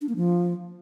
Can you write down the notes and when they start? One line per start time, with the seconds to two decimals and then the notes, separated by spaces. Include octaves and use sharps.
0.01 D4
0.09 A#3
0.16 F3